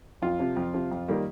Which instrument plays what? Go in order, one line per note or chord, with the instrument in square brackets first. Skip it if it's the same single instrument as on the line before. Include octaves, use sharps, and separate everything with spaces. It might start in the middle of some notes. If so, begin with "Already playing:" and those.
[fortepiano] F2 F4
C3 F3
F2
C3 F3
F2
D#3 G3 A#3